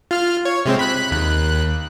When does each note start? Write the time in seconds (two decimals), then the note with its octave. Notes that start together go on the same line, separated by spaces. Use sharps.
0.11 F4 F6
0.45 C#5
0.66 C3 G#3 C4
0.79 B5 F#6 B6
1.11 D#2 F#6